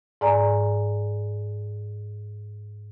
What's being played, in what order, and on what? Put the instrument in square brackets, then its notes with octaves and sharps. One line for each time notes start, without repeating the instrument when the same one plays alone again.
[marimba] G#2 D5 G#5 A#5